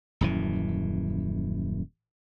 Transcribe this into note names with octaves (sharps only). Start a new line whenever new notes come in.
D#1 F#2 E3